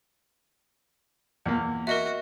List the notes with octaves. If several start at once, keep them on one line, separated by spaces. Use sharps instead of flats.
E2 A#3
F#4 A#4 D#5 E5